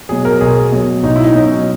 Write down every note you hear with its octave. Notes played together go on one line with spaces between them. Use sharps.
B2 F#3 G#4
A#4
B1 G#4
B2 F#3
B1 D#4
E4
D#4
B2 F#3
C#4